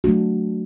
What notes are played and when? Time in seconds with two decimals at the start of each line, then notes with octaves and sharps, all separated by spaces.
0.04 F#3 A3 D4 F#4